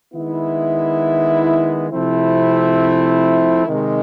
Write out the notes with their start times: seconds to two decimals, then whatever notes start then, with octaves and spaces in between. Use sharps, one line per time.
0.14 D#3 G#3 B3 E4
1.90 C3 F3 A3 C4 E4
3.66 C3 D#3 G#3